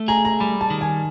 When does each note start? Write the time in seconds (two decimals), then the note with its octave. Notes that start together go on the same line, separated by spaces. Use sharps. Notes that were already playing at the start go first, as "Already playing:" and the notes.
Already playing: A3
0.08 G#4 A#5
0.25 A#5
0.40 G3 B5
0.61 A5
0.70 D#3
0.81 G#5